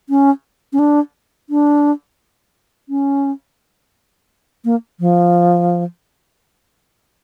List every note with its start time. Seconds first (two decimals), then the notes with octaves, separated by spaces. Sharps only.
0.09 C#4
0.73 C#4
0.79 D4
1.50 D4
2.89 C#4
4.65 A#3
5.00 F3